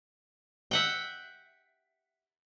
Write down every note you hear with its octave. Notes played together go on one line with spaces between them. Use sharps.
E5 F#5 G5